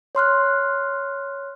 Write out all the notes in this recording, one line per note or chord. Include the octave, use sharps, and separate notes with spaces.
C#5 C6 F6 F#6